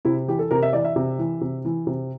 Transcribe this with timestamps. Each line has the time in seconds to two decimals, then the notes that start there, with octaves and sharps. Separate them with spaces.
0.05 C3 E4
0.28 E3 G4
0.39 A4
0.51 C3 A#4
0.62 E5
0.73 E3 D5
0.85 E5
0.96 C3
1.19 E3
1.41 C3
1.65 E3
1.87 C3